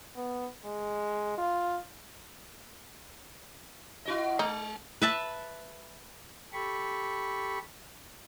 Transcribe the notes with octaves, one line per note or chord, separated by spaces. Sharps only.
B3
G#3
F4
E4 F#4 D#5
G#3 D#4
B4 E5 A5
G4 A4 B5 C#6